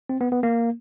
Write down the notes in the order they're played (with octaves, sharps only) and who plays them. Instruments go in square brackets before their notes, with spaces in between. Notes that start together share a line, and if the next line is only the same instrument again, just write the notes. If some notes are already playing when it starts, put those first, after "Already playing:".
[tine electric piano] C4
B3
B3
A#3